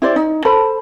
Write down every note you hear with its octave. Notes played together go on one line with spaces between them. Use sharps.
E4 G4 C5 D5
D#4
A4 C5 B5